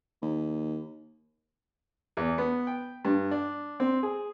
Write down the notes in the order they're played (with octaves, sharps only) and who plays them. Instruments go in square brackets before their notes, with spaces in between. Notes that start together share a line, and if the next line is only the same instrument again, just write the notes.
[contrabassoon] D#2
[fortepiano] E2
B3
G5
G2
D4
C4
G#4